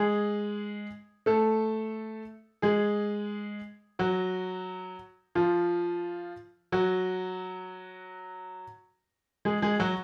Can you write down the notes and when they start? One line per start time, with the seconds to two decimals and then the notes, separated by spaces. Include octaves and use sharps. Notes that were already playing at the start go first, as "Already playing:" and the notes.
Already playing: G#3 G#4
1.26 A3 A4
2.62 G#3 G#4
3.99 F#3 F#4
5.35 F3 F4
6.72 F#3 F#4
9.45 G#3 G#4
9.62 G#3 G#4
9.80 F#3 F#4